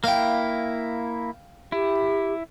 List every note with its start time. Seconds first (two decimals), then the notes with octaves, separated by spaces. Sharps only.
0.04 A#3 E4 F5 G5
1.72 E4 G4